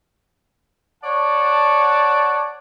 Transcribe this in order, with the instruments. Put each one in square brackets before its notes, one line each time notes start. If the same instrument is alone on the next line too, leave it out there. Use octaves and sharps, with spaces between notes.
[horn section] C#5 D5 F#5 A5